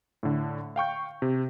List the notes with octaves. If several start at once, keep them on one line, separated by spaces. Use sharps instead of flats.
A2 D3
F5 G5 C#6 G6
C3